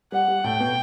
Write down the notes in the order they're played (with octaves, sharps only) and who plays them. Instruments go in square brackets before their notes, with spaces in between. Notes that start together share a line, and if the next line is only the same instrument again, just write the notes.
[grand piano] G3 [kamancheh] F#5
[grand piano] G3
[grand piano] A2 A3 [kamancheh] G5
[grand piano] B2 B3